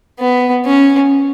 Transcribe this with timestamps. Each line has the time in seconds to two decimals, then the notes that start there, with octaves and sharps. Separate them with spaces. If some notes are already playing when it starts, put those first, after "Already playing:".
0.19 B3
0.66 C#4